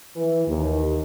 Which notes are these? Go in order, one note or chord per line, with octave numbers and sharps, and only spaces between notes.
E3
D#2